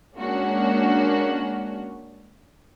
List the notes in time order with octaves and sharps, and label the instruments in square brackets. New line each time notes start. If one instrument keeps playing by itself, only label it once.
[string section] G#3 A#3 C#4 D4 F#4